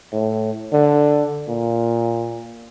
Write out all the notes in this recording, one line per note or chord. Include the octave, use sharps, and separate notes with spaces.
A2
D3
A#2